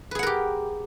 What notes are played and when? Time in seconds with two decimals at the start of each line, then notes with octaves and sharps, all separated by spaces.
0.11 B4
0.15 G#4
0.19 F#5
0.23 A#4
0.27 G4